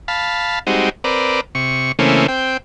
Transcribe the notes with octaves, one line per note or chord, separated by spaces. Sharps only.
F5 A5 B5
G3 G#3 C4 D#4 F#4
C4 A#4 B4 D5
C3 C#6
C#3 E3 A3 A#3 C4 C#4
C4 G5